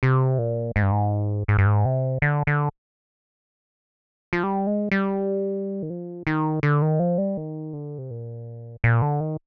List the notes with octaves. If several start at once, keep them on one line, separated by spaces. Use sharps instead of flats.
C3
A#2
G#2
G2
G#2
G#2
G2
G#2
C3
D3
D3
F3
G3
G#3
G3
D#3
F3
D#3
D3
D#3
F3
G3
D#3
D3
C3
A#2
A#2
D3
D#3